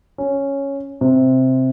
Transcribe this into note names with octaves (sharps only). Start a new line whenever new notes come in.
C#4
C3